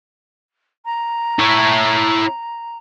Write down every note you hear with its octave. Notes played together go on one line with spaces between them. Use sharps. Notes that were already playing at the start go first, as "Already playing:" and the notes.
A#5
E4 C#5